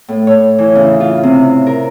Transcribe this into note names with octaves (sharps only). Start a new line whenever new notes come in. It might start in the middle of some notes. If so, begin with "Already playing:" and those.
A2
C#5
E3
C#3
F4
C3
A#4